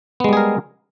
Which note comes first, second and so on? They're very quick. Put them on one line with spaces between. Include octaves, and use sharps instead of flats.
B3 G#3 G3 G#4 A#4